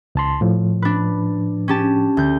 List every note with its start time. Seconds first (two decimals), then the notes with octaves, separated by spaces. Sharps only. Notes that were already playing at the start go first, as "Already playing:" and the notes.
0.15 C#2 A5 C6
0.41 A2 F3
0.82 D4 B4
1.68 C#4 G4 A5
2.17 D2 G6